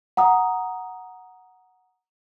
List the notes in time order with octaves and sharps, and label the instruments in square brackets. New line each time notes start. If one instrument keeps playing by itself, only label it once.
[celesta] F#5 A#5 D#6